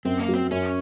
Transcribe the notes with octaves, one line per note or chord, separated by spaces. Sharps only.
F#2 C4
A#3
F#3
C4
F#2 C#4